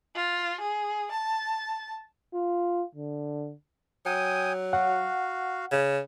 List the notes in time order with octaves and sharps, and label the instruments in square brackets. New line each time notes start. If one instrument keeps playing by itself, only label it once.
[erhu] F4
G#4
A5
[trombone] F4
D3
[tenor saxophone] F#3 [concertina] G5 G#5 D#6
[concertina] F#4 F5 [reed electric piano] F#5
[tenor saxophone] C#3